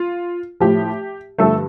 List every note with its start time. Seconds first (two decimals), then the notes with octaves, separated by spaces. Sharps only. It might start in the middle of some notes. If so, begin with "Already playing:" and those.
Already playing: F4
0.60 A2 F3 G4
1.38 G2 D3 F3 A3 A4